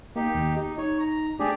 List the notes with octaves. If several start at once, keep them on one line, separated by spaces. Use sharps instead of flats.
A#3 D#4 G4
D#2
D#4 G4
D#4 C#5
A#5
A3 D4 G4 G#4 D5